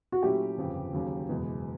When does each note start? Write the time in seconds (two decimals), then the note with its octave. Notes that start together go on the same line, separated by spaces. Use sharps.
0.12 F#4
0.22 A#2 F#3 A3 C#4 E4 G4
0.57 G1 F2 C#3
0.93 D#2 C#3 F#3
1.29 F#1 E2 B2 G#3 B3